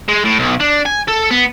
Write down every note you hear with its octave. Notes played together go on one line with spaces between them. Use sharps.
G#3
A2
B1
D4
G#5
A4
B3